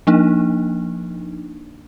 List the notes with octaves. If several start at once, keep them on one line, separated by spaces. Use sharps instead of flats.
F3 A#3 D4 D#4